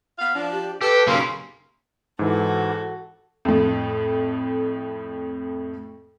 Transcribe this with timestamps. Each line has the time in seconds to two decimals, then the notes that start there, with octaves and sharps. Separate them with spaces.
0.19 B3 F5
0.35 F3 D4
0.52 G4
0.81 G4 A4 B4
1.07 D#2 C#3 F#3 A#3 C6
2.19 G#2 E3 F#4 A4
3.45 F2 A2